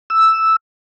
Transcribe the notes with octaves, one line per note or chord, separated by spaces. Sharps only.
E6